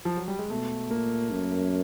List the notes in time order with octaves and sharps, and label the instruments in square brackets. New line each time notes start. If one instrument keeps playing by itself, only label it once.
[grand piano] F3
F#3
G3
G#3
[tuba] B2 [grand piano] A3
[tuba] A#2 [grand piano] A#3
[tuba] F#2